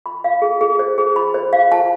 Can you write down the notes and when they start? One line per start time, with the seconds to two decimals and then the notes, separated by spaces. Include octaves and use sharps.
0.06 B5
0.24 F5
0.42 G#4
0.61 G#4
0.79 C5
0.98 G#4
1.16 B5
1.34 C5
1.53 F5
1.72 A5